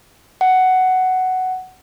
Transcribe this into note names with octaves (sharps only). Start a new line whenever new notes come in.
F#5